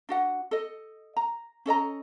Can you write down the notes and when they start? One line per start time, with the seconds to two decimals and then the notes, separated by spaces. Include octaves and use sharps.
0.09 D4 F#4 F#5
0.51 A4 D#5
1.17 A#5
1.66 C#4 A4 D#5 A#5